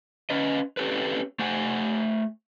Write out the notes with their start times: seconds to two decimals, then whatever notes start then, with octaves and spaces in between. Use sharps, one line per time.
0.30 C#4 B4 D#5
0.77 C4 C#4 G4 A4 B4
1.39 A3 G4 C5 F#5 G#5